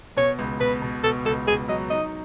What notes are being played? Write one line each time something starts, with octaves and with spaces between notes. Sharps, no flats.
B2 C#5
C#2
B2 B4
B2
B2 A4
C#2 A4
C#2 G#4
F#3 D#5
D#4 D#5